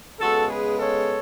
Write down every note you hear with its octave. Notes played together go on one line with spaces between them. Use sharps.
C#3 G#3 B3 F#4 A4
G#4 B4
A4 C#5